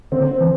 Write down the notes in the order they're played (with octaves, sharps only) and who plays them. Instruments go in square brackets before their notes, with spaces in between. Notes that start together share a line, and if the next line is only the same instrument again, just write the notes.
[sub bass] D3 [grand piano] C4
[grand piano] C4
[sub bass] E3